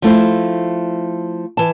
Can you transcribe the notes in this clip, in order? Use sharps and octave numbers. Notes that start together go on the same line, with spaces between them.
F3 A3 E4 C5
E3 A5